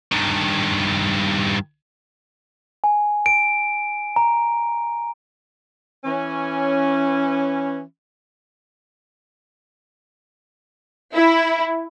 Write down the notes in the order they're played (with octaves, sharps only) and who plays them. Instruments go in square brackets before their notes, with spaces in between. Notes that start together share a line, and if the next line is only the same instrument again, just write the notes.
[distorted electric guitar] G2 D#3
[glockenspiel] G#5
D7
A#5
[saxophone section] E3 C#4
[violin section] E4